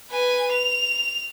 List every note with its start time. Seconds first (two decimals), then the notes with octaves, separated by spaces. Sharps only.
0.11 B4 G#5
0.52 F7